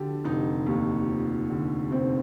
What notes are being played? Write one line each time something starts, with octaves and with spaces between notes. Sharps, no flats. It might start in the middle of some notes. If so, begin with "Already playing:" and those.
Already playing: D3 F3 G4 A4
F1 D#4
D#2
F3
D3
F1 C4